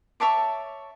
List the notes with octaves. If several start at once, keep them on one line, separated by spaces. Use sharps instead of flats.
C#5 E5 A5 D6